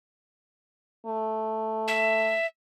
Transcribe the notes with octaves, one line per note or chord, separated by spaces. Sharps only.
A3
E5